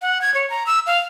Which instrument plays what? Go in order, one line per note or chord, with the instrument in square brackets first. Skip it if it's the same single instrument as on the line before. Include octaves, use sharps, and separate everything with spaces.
[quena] F#5
G#6
C#5
A#5
E6
F5